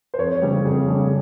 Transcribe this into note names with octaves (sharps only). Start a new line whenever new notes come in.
C5
F2 C#5
C#3 G3
F2 G#4
C#3 G3